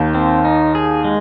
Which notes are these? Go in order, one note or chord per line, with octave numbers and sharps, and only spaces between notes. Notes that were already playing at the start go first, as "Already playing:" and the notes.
Already playing: D#2 D#3
C4
D#4
G#4
G#3